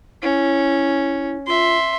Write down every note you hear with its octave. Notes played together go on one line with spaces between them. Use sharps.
C#4 E4
F4 E5 C6